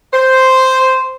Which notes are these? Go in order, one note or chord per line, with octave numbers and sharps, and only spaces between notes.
C5